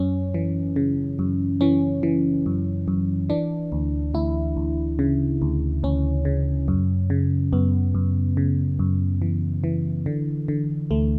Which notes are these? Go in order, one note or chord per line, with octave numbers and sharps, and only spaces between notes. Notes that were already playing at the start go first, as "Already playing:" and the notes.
Already playing: F#2 C#4
E3
C#3
F#2
E3 C#4
E3
F#2
F#2
E3 D4
D2
D2 E4
D2
C#3
D2
D2 C#4
C#3
F#2
C#3
F#2 B3
F#2
C#3
F#2
E3
E3
D3
D3
D2 A3